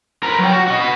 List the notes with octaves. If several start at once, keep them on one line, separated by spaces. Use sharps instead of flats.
A#4 B4
F#3 G5
F#4
F#4 D#5
F#4 B4